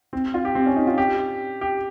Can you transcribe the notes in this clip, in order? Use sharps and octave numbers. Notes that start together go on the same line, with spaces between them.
C4
F4
G4
C4
C#4
D#4
F4
G4
G4